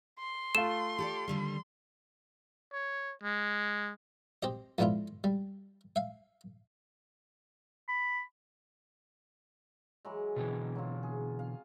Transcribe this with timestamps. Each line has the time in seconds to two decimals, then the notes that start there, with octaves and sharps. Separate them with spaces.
0.20 C6
0.55 A3 F4 E7
0.99 G4 A4 D5
1.28 D#2 D3 G3
2.73 C#5
3.23 G#3
4.43 C4 G4 D#5
4.78 F2 G#2 B3 D4 E4 F4
5.24 G3
5.96 E5 F5
7.89 B5
10.05 E3 F#3 G#3
10.36 B2 D3 E3 C4
10.75 F#3 F4
11.03 G#4
11.39 F5